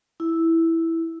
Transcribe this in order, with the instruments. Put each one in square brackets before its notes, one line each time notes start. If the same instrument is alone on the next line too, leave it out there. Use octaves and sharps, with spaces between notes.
[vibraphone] E4